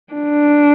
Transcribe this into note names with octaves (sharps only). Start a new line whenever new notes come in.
D4